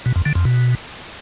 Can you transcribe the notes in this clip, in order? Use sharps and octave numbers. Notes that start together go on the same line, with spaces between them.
B2
F2
D3
F2
B2